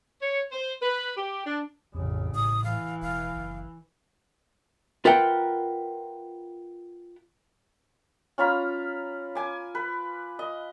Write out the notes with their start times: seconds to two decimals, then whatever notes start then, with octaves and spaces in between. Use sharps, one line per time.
0.21 C#5
0.51 C5
0.81 B4
1.16 G4
1.45 D4
1.94 A1 F2 C#3
2.35 A2 D#6
2.64 E3 F5
3.02 E1 F5
3.36 F#1
5.05 F4 A#4 B4 E5 F#5 G5
8.38 C#4 F4 A#5 B5
9.35 G#5 D6
9.75 B4
10.39 D#5